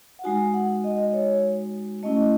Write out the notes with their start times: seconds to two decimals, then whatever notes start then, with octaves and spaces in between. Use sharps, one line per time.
0.19 F#5
0.24 G#3 D#4 F#4 G#5
0.54 F#5
0.84 D#5
1.13 C#5
2.03 A3 C#4 E4 D#5